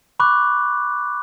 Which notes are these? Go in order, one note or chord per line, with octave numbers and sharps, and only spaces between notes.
B5 C#6 D6 F#6